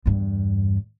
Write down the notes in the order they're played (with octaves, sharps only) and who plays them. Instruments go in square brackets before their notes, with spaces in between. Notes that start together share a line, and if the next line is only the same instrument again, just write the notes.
[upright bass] E2 G2